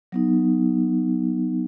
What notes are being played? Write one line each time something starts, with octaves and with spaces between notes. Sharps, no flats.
F#3 B3 D#4